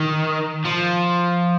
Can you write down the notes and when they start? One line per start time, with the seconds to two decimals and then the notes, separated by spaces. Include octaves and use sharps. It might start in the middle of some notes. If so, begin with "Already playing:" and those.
Already playing: D#3
0.65 F3